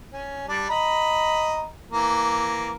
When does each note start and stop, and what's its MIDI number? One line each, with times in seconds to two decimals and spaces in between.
0.13 0.48 61
0.48 0.66 55
0.48 0.66 62
0.70 1.66 75
0.70 1.66 82
0.70 1.66 83
1.91 2.76 52
1.91 2.76 58